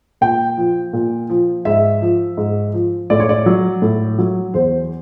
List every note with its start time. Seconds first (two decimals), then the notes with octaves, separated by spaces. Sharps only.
0.21 A#2 G5
0.57 F3
0.93 A#2
1.29 F3
1.65 G#2 E5
2.02 F3
2.37 G#2
2.74 F3
3.10 A2 D5
3.20 C#5
3.29 D5
3.46 F#3
3.82 A2
4.19 F#3
4.54 E2 C5